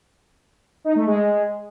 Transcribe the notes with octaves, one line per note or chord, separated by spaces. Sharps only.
D#4
A3
G#3